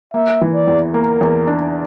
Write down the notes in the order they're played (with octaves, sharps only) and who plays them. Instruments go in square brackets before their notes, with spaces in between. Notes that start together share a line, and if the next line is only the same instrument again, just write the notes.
[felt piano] A#3 [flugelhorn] E5
[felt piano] E3
[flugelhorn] D5
[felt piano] E2
[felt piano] A#3 [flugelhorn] A#4
[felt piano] E2
D4